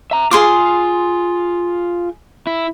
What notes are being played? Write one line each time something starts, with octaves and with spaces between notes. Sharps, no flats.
E5 A#5
F4 G#4 C6 D6
E4